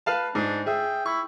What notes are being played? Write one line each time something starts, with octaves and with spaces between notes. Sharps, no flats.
B4 F5 A5
G#2 D4
G#4 E5 G5
E4 C#6